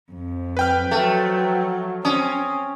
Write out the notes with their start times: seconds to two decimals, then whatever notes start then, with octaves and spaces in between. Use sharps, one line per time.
0.11 F2
0.57 B4 G5 F6
0.91 F3 F#3 A3
2.05 C4 C#4 D#6